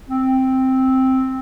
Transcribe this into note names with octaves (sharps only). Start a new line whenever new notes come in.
C4